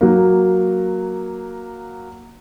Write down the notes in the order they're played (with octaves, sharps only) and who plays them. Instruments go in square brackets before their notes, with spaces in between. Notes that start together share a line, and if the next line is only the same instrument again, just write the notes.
[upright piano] F#3 A#3